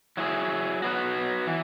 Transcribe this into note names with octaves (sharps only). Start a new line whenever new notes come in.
F#3 E4 G#4
F#3 B3 F#4
E3